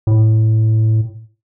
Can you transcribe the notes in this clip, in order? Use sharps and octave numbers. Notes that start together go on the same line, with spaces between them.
A2